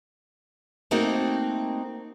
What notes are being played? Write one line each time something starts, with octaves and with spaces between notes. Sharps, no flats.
A3 A#3 C4 D#4 F#4